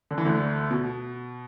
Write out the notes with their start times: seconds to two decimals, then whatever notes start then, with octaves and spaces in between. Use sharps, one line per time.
0.11 D3
0.18 E3
0.25 D2 D3
0.70 B2